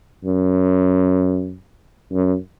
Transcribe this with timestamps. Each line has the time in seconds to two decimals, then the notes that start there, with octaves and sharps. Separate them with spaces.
0.25 F#2
2.12 F#2